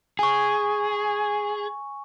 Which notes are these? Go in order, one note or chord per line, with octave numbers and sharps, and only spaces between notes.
G#4 G#5 C#6